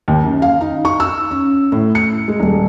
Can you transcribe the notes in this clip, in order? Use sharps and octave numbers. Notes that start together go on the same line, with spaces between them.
D#2
F#2
F5
D#4
C#6
E6
C#4
A2
C#7
G#3
D#1